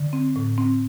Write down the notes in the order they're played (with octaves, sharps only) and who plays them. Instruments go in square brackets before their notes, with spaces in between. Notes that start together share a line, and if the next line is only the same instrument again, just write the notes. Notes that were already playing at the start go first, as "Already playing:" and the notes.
Already playing: [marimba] D3
C4
A2
C4